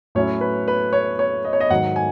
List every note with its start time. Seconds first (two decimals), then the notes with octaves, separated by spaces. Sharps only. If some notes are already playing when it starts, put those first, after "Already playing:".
0.15 A2 F#3 C#4 E4 C#5
0.41 B4
0.68 B4
0.93 C#5
1.19 C#5
1.45 D#5
1.53 C#5
1.60 D#5
1.70 G#2 D#3 F#3 F#5
1.96 G#5